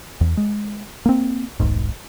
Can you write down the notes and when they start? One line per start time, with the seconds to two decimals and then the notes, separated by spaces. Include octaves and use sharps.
0.21 E2
0.37 G#3
1.06 A#3 C4
1.60 D#1 B1 G#2